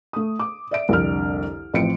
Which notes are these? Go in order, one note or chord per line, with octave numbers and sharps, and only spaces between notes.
A3 D#6
D6
D5 E5 D7
C2 F2 D3 D4 F6
A1 F3 C4 C#7 D7